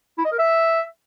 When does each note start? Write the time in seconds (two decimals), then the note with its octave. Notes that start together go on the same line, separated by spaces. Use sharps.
0.18 E4
0.25 D#5
0.32 A#4
0.39 E5